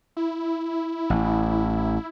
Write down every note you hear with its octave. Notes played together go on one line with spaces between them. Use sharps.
E4
A1